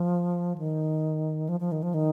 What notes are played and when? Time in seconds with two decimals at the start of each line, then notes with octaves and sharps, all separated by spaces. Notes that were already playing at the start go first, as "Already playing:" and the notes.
Already playing: F3
0.58 D#3
1.49 F3
1.60 F3
1.72 D#3
1.83 F3
1.94 D#3